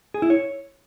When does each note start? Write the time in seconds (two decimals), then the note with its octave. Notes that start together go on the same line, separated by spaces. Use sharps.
0.14 G#4
0.22 E4
0.30 C#5